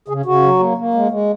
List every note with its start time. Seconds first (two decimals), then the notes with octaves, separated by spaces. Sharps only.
0.08 C#3 G#4
0.25 C#3 F#4
0.42 F#3
0.59 A#3
0.77 A#3
0.94 G#3
1.11 G#3